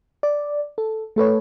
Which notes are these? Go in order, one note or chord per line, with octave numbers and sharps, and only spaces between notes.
D5
A4
A3 A4 B4 C#5